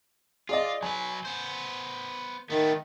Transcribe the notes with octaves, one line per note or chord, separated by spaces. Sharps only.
F4 G#4 D5 D#5
F#3 B4 G#5
B3 C5
D#3 A3 B3